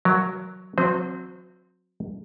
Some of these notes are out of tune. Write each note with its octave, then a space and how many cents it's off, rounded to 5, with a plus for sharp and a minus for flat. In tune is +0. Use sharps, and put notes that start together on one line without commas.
F#3 +0 A#4 +0
F#3 -30 C4 +5 C5 -45